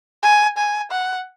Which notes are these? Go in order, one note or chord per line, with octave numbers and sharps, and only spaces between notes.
G#5
G#5
F#5